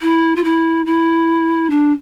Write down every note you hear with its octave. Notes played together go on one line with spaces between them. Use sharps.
E4
F4
E4
E4
D4